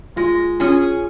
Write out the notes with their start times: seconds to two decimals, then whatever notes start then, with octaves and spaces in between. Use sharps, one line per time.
0.16 G#3 F4
0.60 C#4 F4 G#4